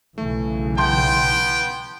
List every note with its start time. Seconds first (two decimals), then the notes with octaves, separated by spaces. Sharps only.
0.18 B1 C#3 E3 A3
0.77 B3 G5 A5 C6 G6